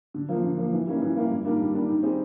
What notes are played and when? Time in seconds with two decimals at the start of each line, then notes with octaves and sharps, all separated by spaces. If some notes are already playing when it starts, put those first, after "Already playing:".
0.14 D3
0.29 F3 A#3
0.43 D3
0.58 F3 A#3
0.73 E3
0.86 G3 A#3 C#4 E4
1.02 E3
1.16 G3 A#3 C#4 E4
1.31 G2
1.45 D#3 G3 A#3 D4
1.60 G2
1.74 D#3 G3 A#3 D4
1.89 D#3
2.03 G3 C4 D#4 G#4